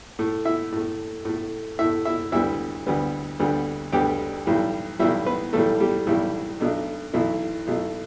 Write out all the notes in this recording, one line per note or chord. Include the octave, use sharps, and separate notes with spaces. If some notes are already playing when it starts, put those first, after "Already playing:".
A2 A3
E4 E5
A2 A3
A2 A3
A2 A3 E4 E5
E4 E5
D2 D3 G3 B3 E4 E5
D2 D3 G3 B3
D2 D3 G3 B3
D2 D3 G3 B3 G4 G5
B1 A2 E3 G3
B1 A2 E3 G3 E4 E5
B3 B4
B1 A2 E3 G3 A3 A4
G3 G4
B1 A2 E3 G3 E4
B1 B2 A3 D4
B1 B2 E3 A3 E4
B1 B2 A3